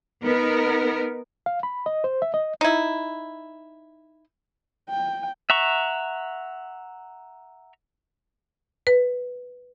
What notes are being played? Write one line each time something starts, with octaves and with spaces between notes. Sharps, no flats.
B3 D#4 A#4
F5
B5
D#5
C5
E5
D#5
D#4 E4
G5
E5 F#5 A#5 C#6
B4